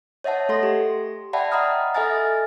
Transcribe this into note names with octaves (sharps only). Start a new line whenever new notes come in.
C#5 D#5 E5 F#5 A5
A3 A4 C6 A#6
G4
D5 E5 F#5 G5 A5 B5
D#5 F#5 A#5 B5 D#6 F6
A4 D#5 E5 G#5 F6 A6